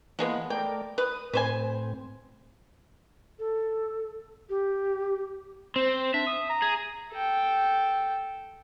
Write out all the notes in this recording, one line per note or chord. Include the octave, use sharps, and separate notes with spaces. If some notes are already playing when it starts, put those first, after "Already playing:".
E3 F3 G#3 A#3 B3 F#5
A3 A#4 D5 G5
B4 D#6
A2 C4 B4 C5 G#5
A4
G4
C4 C5
D4 E5
D#6
A#5
G#4
A4 G5